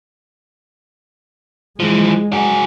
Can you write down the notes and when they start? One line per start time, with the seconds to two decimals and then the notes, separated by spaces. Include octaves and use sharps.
1.80 E3 F3 G#3
2.33 F#4 G#4